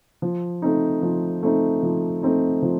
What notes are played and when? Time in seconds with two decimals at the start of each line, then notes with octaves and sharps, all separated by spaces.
0.22 F3
0.62 A3 C4 D#4
1.02 F3
1.43 A3 C4 D#4
1.83 F3
2.23 A3 C4 D#4
2.62 F3